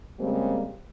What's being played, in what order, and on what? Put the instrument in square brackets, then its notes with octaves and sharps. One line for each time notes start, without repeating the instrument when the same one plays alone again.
[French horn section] C#3 G3 G#3 A#3 C4